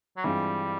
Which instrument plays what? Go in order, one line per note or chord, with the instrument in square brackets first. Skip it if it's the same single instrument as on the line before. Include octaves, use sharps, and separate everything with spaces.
[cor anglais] F#3
[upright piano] G2 E3 G#3 C4 F4 [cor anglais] G3